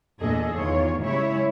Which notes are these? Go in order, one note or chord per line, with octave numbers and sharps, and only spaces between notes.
E2 A#2 D4 G#4 A4 D#5
E2 D#3 F4 C#5
C#3 G3 G#3 E4 C#5 E5